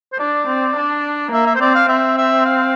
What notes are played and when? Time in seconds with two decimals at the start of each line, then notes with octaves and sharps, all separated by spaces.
0.12 C5
0.19 D4 D5
0.47 C4
0.76 D4
1.32 A#3 E5
1.46 E5
1.55 C5
1.61 C4 D5
1.75 F5
1.89 C4 E5
2.18 E5
2.45 F5